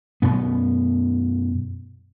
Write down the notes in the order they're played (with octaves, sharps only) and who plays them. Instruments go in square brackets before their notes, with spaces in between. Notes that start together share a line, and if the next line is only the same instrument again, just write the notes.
[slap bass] F#2 B2 B3